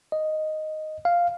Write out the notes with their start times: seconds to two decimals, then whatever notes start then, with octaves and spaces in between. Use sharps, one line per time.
0.12 D#5
1.05 F5